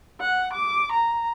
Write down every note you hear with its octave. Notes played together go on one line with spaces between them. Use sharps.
F#5
D6
A#5